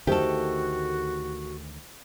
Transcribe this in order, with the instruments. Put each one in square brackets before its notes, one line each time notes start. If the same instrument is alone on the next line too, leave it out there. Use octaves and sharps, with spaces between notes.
[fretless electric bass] D2 D#3 A3 [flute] F#4 [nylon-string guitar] G4 A4 [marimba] C5